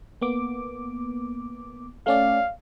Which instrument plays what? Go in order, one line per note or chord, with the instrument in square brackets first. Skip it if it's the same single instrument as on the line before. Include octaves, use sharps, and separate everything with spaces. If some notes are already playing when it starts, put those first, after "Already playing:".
[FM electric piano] A#3 B3 D6
[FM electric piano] A3 C#4 D5 [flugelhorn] F5